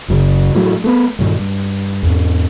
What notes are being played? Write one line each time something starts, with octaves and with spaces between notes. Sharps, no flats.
F#1 F#2 C#3
A2 E3 F#3 A3
A3 B3
G2 A#2 D#3
G2
E2 G#2